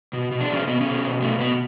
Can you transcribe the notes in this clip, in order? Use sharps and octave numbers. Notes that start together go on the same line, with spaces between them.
B2
B2
D4
B2 C#4
B2 B3
C#4
B2
B2
B2 A3
B2 B3